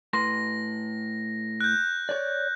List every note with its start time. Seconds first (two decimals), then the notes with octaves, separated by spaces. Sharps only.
0.13 A2 B4 C6 A#6
1.61 F#6 G6
2.09 C#5 D5